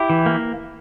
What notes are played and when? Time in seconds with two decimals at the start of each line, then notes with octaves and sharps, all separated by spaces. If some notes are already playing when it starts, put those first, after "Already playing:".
Already playing: E4 G4
0.10 E3
0.26 A#3